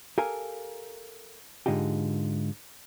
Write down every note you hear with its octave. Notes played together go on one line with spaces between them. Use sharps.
G4 A4 A#4 F5 G#5
G#2 D3 D#4 F4 G4